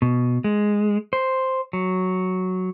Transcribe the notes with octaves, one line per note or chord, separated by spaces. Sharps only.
B2
G#3
C5
F#3